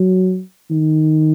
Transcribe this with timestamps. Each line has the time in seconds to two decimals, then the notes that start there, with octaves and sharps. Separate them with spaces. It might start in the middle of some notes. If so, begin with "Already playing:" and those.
Already playing: F#3
0.70 D#3